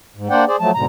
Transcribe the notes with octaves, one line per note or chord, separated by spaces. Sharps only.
G#2
A#3 D4 C5 D5 F#5 G5
G#4 C5 D5
F3 F#3 A3 A5
G#2 B2 D3 A#5